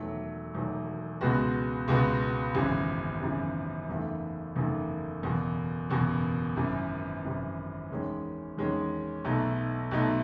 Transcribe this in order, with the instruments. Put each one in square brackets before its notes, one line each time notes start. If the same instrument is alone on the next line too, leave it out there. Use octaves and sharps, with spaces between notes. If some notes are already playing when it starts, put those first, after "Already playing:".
Already playing: [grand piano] E1 E2 D#3 F#3 A3
E1 E2 D#3 F#3 A3
C#2 B2 G#3 B3 F#4
C#2 B2 G#3 B3 F#4
G#1 F#2 C#3 E3
G#1 F#2 C#3 E3
F#1 E2 D#3 A3
F#1 E2 D#3 A3
F#1 E2 B2
F#1 E2 B2
G#1 F#2 E3
G#1 F#2 E3
E2 D#3 G#3 C#4
E2 D#3 G#3 C#4
B1 B2 A3 D#4
B1 B2 A3 D#4